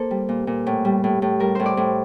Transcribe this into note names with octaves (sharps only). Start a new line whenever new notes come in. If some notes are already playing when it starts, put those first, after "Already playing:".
Already playing: A#3 A4 C5
G3
A#2
A#2
A2
G3
A2
A2
G3 A#4
A2 C5
D5
A2